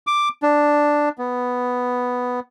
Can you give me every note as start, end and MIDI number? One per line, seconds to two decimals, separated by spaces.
0.07 0.29 86
0.43 1.09 62
1.18 2.40 59